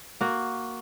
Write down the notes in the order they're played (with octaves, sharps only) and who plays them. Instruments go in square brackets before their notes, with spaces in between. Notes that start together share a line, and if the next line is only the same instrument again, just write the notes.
[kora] A#3 F#4